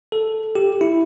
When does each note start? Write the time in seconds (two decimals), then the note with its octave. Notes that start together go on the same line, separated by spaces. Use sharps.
0.12 A4
0.55 G4
0.81 E4